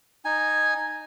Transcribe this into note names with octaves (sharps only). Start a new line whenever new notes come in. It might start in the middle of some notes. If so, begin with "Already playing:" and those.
D#4 G#5